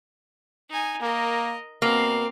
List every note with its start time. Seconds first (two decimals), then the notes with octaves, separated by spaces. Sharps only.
0.70 D#4 G#5
1.02 A#3 A#4 D#5
1.82 B2 A#3 C4 F5